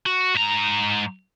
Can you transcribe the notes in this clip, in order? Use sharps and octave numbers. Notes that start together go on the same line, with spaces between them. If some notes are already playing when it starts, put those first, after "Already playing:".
F#4
G#2 A#5